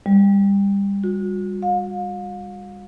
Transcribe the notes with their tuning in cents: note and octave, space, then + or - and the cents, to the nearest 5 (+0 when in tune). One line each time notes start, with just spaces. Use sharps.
G3 +25
F#4 -40
F5 +40